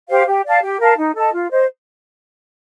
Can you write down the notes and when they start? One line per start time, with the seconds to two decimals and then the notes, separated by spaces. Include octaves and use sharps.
0.09 G4 C5 F5
0.27 G4
0.45 D5 F5 A5
0.62 G4
0.80 A#4 F5 A5
0.97 D#4
1.15 A4 D#5 A5
1.33 F4
1.50 C5 D#5